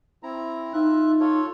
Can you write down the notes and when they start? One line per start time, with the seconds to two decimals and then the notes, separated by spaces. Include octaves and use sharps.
0.23 C4 E4 A#5
0.73 D#4 F4 E5 F#6
1.20 F4 A4 C#5